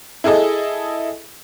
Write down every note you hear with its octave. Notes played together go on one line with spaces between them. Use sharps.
E4 G#4 A4 D#5